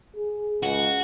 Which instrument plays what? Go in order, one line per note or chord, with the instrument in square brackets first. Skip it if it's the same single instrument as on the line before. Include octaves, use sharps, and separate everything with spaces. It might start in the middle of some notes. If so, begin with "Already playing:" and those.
[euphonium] G#4
[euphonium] C#2 [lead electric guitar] F#4